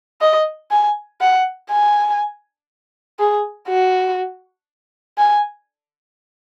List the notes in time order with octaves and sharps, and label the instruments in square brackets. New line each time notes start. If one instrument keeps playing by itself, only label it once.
[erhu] D#5
G#5
F#5
G#5
G#4
F#4
G#5